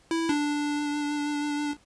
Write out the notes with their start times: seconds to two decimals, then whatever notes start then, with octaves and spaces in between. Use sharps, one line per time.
0.11 E4
0.29 D4